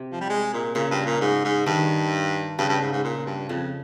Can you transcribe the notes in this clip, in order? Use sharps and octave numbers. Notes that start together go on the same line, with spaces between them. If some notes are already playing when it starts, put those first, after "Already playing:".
Already playing: C3
F3
G3
G#3
A#2
A#2 C#3
G2
A#2
G#2
G#2
G2 D#3
G2 C#3
G2
G#2
G#2
A#2
G2
F2 C#3